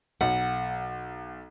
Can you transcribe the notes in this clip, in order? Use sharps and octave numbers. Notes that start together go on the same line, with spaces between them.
B1 F#5